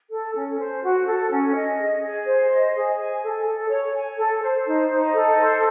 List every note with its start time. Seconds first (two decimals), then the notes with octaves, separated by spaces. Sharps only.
0.11 A4
0.36 C#4
0.59 C5
0.84 F#4
1.07 A4
1.31 C#4
1.55 D#5
1.79 G#4
2.03 G#4
2.27 C5
2.51 D#5
2.76 G#4
2.99 G#5
3.23 A4
3.47 A4
3.70 C#5
3.95 G#5
4.18 A4
4.43 C5
4.67 D#4
4.90 D#4
5.14 A4
5.38 C5